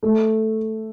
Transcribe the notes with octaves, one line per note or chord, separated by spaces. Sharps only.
A3